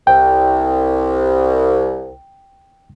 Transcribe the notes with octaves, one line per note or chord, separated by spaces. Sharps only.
C2 G5